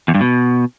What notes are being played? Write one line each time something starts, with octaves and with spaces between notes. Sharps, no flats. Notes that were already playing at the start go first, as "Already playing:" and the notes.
E2
G2
B2